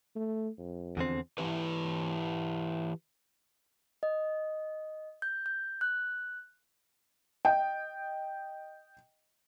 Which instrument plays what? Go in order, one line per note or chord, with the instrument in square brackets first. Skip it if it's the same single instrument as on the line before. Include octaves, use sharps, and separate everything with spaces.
[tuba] A3
F2
[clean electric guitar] E2 D3 C4
[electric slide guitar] E3 E4 G4 B4
[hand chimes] D#5
G6
G6
F#6
[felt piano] D#5 G5